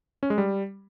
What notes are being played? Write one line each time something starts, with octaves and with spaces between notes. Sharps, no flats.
C#4
G#3
G3